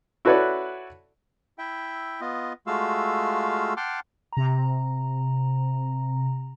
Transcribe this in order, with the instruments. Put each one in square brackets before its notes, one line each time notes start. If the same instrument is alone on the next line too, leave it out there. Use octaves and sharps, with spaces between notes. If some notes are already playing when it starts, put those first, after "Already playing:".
[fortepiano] E4 F#4 A4 B4 C#5 D5
[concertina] E4 E5 G5
B3 F4 D#5
G#3 A3 F4 F#4 F5 E6
F#5 G5 A5 C6 D6 F6
[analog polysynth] C3 A#5